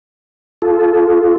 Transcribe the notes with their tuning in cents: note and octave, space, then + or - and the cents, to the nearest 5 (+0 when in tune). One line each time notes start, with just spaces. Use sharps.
F4 +0 A4 -20